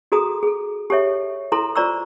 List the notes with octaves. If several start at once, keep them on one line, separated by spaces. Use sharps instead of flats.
F#4 G#4 A4 A#5 D#6
G#4 A4
G4 A4 C#5 E5
E4 A4 A#5 C6
F4 C5 D5 A#5 C#6 E6